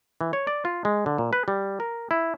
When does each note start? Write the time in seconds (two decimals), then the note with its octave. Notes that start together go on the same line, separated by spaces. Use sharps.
0.21 E3
0.33 C#5
0.47 D5
0.65 F4
0.85 G#3
1.06 D3
1.18 A#2
1.33 B4
1.48 G3
1.80 A#4
2.11 E4